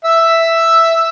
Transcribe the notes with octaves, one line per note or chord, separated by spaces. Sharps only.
E5 E6